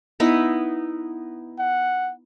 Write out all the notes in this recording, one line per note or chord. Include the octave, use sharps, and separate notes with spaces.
B3 D#4 E4
F#5